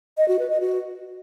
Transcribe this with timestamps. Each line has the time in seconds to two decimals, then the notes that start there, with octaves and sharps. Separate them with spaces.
0.18 D#5
0.28 F#4
0.39 B4
0.50 D#5
0.60 F#4